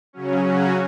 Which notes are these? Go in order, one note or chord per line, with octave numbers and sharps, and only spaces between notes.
C#3 F#3 C#4
C#3 F#3 C#4 F#4